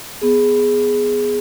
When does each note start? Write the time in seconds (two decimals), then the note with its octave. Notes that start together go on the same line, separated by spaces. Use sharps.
0.21 B3 G#4